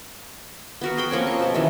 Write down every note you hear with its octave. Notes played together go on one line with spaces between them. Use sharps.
B3 F#4 A#4
G#4 G5 B5
F3 A#3 C4 C#4
C#6
B2 A5
D#3 E3 F#3 C#4